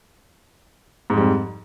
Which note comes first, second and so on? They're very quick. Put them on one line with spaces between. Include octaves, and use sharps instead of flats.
G#2 F2 G3